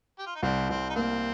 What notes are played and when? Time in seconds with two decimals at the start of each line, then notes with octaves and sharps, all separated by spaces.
0.19 G4
0.27 F4
0.35 D#4
0.43 C2 C4
0.70 C2 C4
0.90 D#4
0.95 A#3 C4